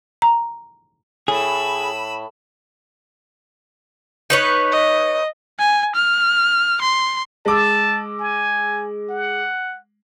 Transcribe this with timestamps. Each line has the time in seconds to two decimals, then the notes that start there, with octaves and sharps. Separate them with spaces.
0.22 A#5
1.28 A2 G#4 B5 E6
4.30 D#4 B4 C#5
4.72 D#5
5.59 G#5
5.96 F6
6.82 C6
7.45 G#3 A5 D6 E6
8.20 G#5
9.10 F#5